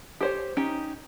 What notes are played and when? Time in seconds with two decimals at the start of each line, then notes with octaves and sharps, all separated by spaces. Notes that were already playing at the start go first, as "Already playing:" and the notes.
0.21 G4 C5 C#5
0.57 C#4 D#4 G4